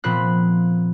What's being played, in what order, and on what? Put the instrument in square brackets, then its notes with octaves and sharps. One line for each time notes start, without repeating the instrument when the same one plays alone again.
[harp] A#2 F3 B3 C4 B5 F#6